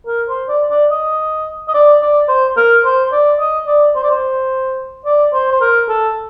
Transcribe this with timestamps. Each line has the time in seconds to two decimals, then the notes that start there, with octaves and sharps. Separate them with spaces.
0.07 A#4
0.29 C5
0.48 D5
0.70 D5
0.91 D#5
1.68 D#5
1.74 D5
2.02 D5
2.28 C5
2.57 A#4
2.84 C5
3.12 D5
3.40 D#5
3.67 D5
3.95 C5
4.03 D5
4.10 C5
5.05 D5
5.33 C5
5.52 C5
5.61 A#4
5.88 A4